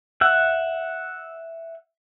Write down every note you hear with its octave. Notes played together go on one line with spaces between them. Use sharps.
E5 F#5